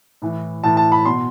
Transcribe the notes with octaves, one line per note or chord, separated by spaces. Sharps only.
A2 E3
A2 E3 A5
A5
B5
B2 C6